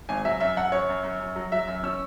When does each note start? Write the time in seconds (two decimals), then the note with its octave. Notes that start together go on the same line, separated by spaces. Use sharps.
0.09 G#1 G#5
0.25 F#3 E5
0.40 F#2 E5
0.57 F#2 F#5
0.72 F#2 C#5
0.89 F#2
1.03 F#2
1.20 F#2
1.36 F#3
1.52 F#3 E5
1.67 F#2
1.83 C#4 E6